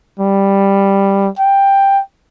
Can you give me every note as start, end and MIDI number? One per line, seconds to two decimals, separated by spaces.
0.20 1.29 55
1.39 2.01 79